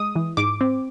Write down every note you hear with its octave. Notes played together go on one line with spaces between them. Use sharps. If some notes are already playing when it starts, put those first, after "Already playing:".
Already playing: G#3 D#6
E3
G#2 D6
C4